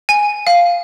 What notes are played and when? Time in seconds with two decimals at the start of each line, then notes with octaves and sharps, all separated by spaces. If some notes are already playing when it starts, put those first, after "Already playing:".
0.09 G#5
0.47 F5